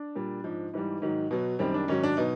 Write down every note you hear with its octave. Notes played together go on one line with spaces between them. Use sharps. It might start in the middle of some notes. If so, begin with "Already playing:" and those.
Already playing: D4
A#2 G3
G#2 F3
G#2 E3 G3
G#2 D#3 F#3
B2 F#3
F#2 D#3 G3 C4
D4
G#2 D#3 F#3 C#4
D4
B2 F#3 D#4